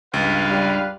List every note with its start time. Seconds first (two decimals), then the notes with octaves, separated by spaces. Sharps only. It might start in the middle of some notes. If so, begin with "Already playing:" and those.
0.14 C#2 G2 B4 F5
0.50 G3